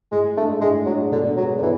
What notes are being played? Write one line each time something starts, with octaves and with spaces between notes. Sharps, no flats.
A2 G#3
G#3 A3 D4
A2 G#3
F#3 G#3 D4
B2 D3
F#3 G#3 B3
D3
B2 E3